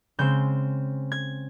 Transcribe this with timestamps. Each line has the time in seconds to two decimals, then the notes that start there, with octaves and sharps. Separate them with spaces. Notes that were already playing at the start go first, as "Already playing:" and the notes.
0.18 C#3 G#3 C4 G6
1.12 G#6